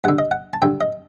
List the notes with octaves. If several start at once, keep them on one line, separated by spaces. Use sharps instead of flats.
G2 D3 F#5
D#5
F#5
A5
G2 D3 G5
D#5